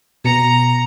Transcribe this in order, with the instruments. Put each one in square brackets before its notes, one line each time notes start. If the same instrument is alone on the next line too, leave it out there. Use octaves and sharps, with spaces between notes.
[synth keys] B2 C#7 [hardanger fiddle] A#5